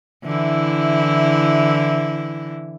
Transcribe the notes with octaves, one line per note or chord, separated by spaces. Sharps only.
D3 E3 E4